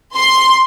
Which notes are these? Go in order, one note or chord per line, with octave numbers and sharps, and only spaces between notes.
C6